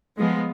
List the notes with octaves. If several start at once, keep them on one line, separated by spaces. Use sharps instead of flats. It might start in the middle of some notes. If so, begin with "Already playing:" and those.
F3 G#3 B3